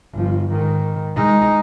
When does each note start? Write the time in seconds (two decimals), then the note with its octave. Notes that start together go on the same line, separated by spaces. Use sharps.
0.13 G1 F3
0.49 G#2 D#3
1.16 G#3 D#4